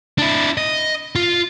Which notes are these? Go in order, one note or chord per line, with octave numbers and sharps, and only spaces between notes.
D4 E4
D#5
F4